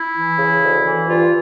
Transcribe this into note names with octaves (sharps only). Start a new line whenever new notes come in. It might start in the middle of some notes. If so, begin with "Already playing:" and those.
Already playing: E4
E3
C#3
D2
E3
G2 F4